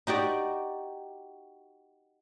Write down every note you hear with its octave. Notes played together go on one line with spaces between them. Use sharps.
D#4 F#4 G4 D5